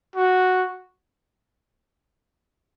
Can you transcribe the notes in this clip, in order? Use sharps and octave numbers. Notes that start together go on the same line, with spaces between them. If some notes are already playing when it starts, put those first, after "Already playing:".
F#4